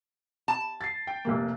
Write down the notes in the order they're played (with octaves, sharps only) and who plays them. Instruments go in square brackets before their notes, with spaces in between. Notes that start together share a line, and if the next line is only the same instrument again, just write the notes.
[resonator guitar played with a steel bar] A5
[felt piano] A6 C7
G5
F1 C3 A#3